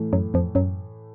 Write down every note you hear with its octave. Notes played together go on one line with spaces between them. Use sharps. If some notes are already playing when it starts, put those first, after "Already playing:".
Already playing: A2 E3 A3
F#2 F#3
F2 F3
F#2 F#3